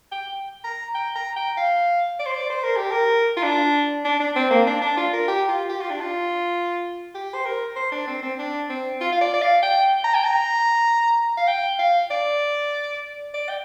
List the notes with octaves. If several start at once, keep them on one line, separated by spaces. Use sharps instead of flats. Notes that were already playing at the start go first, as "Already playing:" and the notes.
G5
A#5
G5
A#5
G5
F5
D5
C5
D5
C5
A#4
G4
A#4
F4
D4
D4
D4
C4
A#3
D4
D4
F4
A#4
G4
F4
G4
F4
D4
F4
G4
C5
A#4
C5
D4
C4
C4
D4
C4
F4
F5
D5
D5
F5
G5
A#5
G5
A#5
F5
G5
F5
D5
D5
G5